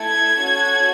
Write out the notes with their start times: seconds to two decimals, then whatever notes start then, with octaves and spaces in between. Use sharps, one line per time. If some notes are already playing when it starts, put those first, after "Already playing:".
Already playing: A3 E4 A4 G#6
0.41 C#4 F#4 A4